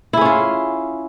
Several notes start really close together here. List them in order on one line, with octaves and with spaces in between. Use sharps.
E4 G#4 C#4 F4